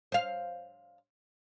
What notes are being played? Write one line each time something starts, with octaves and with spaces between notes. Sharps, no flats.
C5 F5